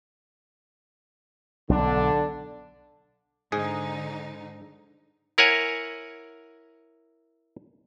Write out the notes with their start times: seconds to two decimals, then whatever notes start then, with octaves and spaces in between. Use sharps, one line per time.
1.70 B1 D3 D4
3.52 G#2 D3 D#4 G#4
5.38 E4 A#4 C#5 F#5 G#5